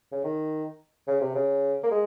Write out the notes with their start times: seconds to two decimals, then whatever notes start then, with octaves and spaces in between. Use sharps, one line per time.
0.12 C#3
0.24 D#3
1.07 C#3
1.21 C3
1.35 C#3
1.83 A#3
1.91 G#3